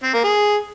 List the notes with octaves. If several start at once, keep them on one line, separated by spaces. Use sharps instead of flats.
C4
A#3
G#4